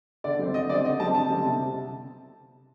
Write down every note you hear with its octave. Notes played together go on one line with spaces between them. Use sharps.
D3 D5
G3 C4
D3 D#5
G3 C4 D5
D3 D#5
G3 C4 A5
D3 A5
G3 C4
C3